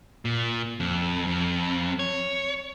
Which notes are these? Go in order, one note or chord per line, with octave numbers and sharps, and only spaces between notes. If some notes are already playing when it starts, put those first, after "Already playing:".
A#2
F2
F2
C#5